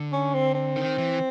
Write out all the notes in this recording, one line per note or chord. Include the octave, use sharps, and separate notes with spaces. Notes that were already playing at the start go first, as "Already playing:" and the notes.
Already playing: D3
C#4
C4
C4
D#3
E3